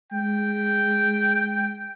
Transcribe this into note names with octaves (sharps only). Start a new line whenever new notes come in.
G#3 G5